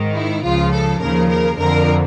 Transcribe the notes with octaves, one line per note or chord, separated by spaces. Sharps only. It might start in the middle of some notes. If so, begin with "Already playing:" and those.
Already playing: G#2 D#3
E4
C#2 C#3 F3 F4
A4
D#2 C#3 F3 A#4
A#4
F2 D3 F3 A#4